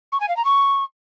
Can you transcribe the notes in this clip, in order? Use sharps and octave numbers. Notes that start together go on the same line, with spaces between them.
C#6
G#5
F5
A#5
C#6